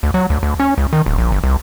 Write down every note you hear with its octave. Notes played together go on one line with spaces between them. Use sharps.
D2
F#3
D2
D2
C#4
C#2
D#3
D1
A#1
G1
C2